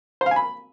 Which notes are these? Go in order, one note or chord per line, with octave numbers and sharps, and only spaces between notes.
C5
F5
G#5
B5